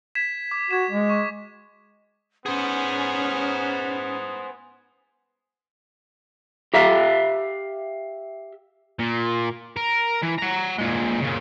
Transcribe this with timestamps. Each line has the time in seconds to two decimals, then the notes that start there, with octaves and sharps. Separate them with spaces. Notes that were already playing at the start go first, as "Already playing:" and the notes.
0.15 G#6 B6 E7
0.51 D6
0.71 F#4 G#6 E7
0.90 G#3
1.10 C#6
2.46 B3 C#4 G#4 C5
6.74 G4 E5 F5
8.99 A#2
9.77 A#4
10.23 E3
10.39 F#5 A#5
10.79 A#2 G#3
11.21 A#2 C#3